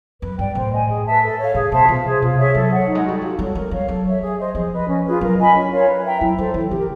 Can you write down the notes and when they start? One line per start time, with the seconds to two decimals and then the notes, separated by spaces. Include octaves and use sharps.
0.21 F#2 B4
0.39 G2 D5 G5
0.55 A2 C5
0.72 D#5 G#5
0.88 G#4
1.05 B4 E5 A5
1.22 A4
1.38 C#5 F5
1.54 A2 G#4
1.72 B2 C5 E5 A5
1.88 B2 F4
2.05 G#4 C5
2.21 C3 F4
2.38 G#4 C#5 E5
2.55 F#3 A4
2.72 C#5 F#5
2.88 D#4
2.95 G#3
3.05 G3 F#4 A4
3.21 F#3 F4
3.38 G3 A4 C#5
3.55 G#3 A#4
3.71 G3 C#5 F5
3.88 F#3 A4
4.04 C#5
4.10 E5
4.21 G#4
4.38 C5 D#5
4.55 F3 G#4
4.71 B4 D#5
4.88 C#4
5.05 F4 G#4 B4
5.21 F#3 A#4
5.37 D#5 G#5 B5
5.54 C#4
5.71 F4 A#4 C#5
5.88 B4
6.04 E5 G5 A#5
6.21 F#3 E4
6.38 F#3 A4 C5
6.54 E3 E4
6.71 D3 G4 A#4